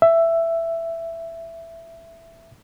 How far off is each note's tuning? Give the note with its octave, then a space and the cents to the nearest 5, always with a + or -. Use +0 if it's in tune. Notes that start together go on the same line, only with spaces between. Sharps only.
E5 +10